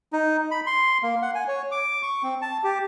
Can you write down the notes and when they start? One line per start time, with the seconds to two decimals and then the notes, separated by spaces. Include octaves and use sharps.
0.13 D#4
0.51 B5
0.66 C6
1.03 A#3
1.22 F#5
1.35 G#5
1.48 C#5
1.71 D6
2.03 C#6
2.23 C4
2.42 A5
2.64 G4